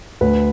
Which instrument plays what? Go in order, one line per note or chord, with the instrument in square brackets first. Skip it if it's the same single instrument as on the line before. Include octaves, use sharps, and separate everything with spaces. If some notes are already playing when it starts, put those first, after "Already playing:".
[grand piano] D2 B4